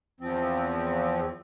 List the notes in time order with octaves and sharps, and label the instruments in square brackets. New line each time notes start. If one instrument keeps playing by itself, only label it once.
[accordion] E2 F3 C4